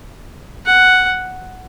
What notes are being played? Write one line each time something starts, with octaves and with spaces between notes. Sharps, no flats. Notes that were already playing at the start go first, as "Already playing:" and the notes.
F#5